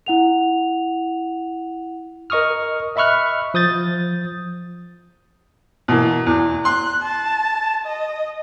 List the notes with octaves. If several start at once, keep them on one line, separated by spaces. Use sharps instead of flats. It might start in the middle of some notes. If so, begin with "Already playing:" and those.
E4 F#5 F7
A#4 D#5 C#6 D#6 F6
D#5 E5 B5 C#6 F6 F#6
F3 D#6 G6 A6
B2 E3 A#3
E2
C6 F#6
A5
D#5